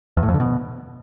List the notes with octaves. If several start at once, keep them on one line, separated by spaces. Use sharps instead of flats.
E2
A2
F2
D3
B2